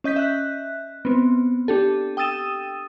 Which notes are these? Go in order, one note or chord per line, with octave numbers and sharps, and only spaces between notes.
C#4 D#5 G6 B6
E5 F#6
B3 C4
D4 G4 A4
G5 D#6 E6 A6 D#7 E7